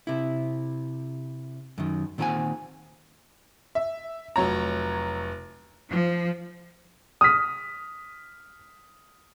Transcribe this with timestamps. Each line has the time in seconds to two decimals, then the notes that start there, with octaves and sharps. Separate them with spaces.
0.07 C3 E4
1.78 F#2 D#3
2.18 A#2 D#3 C4 A4 F#5 G#5
3.75 E5
4.36 F1 F#3 C#5 A#5
5.90 F3
7.21 D#6 F6 B6